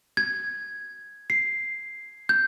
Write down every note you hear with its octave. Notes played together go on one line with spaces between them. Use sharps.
G#6
C7
G6